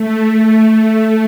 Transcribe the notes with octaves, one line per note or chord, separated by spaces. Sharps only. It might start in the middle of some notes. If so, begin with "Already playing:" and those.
Already playing: A3